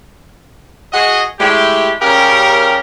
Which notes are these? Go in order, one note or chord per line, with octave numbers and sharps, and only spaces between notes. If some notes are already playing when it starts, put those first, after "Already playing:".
F#4 G#4 D#5
G#3 A3 E4 G4
C#3 G3 C#4 G4 A#4